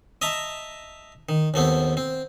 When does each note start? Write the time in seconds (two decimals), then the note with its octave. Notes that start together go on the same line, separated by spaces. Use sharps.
0.22 D#5 E5 A5 A#5
1.29 D#3
1.54 D#2 A3 B3 C4
1.97 C4